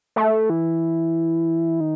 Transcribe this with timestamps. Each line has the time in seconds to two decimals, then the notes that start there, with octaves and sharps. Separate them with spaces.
0.16 A3
0.50 E3
1.80 D#3